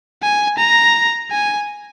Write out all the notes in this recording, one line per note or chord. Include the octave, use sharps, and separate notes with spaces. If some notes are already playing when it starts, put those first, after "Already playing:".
G#5
A#5
G#5